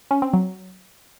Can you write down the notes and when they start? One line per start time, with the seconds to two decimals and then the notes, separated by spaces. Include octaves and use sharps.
0.11 C#4
0.22 C4
0.33 F#3